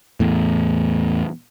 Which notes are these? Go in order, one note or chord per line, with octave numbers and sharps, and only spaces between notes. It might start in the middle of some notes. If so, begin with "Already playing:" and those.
E2 A2